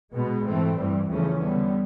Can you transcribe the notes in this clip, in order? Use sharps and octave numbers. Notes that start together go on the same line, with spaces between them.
B2 G#3 B3
G#2 E3 A3 C4
G2 E3 G3
E2 C#3 F3 A3 C#4
D3 G3 B3